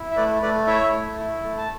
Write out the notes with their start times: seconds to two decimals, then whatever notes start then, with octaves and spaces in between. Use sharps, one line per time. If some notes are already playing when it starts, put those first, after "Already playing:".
Already playing: E4
0.11 E5
0.16 A3 B4 D5
0.42 A3 B4 D5
0.67 E4 C#5 E5
0.93 A3
1.18 E4
1.43 A3
1.58 A5